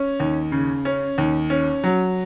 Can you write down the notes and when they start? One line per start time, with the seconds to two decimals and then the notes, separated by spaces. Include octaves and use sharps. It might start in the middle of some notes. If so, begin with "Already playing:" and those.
Already playing: C#4
0.20 D#2
0.52 C#3
0.85 C#4
1.18 D#2
1.50 C#4
1.84 F#3